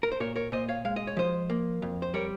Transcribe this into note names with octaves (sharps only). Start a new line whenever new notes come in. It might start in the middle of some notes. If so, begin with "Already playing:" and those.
A#4
C5
A#2 A#4 C#5
A#4 C#5
A#2 C5 D#5
C#5 F5
G#3 F5
D#5
C#5
F3 C5 D#5
A#3
F2
C5
G3 A#4 C#5